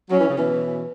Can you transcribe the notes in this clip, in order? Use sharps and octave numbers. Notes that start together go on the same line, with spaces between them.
F#3 C#4
E3
C#3
B2 E3